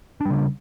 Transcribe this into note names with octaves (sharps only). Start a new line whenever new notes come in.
C#3 G3 D4